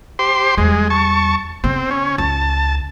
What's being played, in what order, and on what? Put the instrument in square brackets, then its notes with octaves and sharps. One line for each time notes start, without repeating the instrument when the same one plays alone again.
[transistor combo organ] G4 C5 C6
[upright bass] E2 G3 [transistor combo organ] G#3
[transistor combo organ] A5 C#6
[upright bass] C#3 B3 [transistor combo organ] C4
[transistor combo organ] C#4
[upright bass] C#2 [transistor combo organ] A5